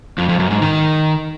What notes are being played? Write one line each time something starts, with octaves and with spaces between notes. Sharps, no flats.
F2
F2
F#2
G#2
D#3